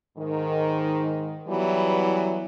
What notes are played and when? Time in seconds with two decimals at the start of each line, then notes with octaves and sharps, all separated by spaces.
0.17 G#2 D#3
1.47 E3 F#3 G3 B3 E4